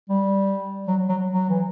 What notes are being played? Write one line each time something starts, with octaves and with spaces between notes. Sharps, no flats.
G3
F#3
F#3
F#3
E3